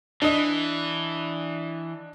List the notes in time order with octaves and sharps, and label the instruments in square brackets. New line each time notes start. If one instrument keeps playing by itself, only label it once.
[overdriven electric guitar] E3 [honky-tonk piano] D4 D#5